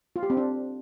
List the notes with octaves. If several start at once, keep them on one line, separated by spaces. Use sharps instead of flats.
F4
G4
C4
D4